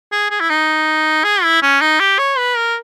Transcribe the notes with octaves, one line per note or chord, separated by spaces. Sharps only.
G#4
G#4
E4
D#4
G#4
E4
C#4
D#4
G4
C#5
B4
A#4